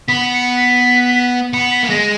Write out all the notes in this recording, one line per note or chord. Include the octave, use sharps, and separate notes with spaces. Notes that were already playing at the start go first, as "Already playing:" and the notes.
B3 B6
C#7
B6
B3 C#7
B6
A#3
G#3 A#6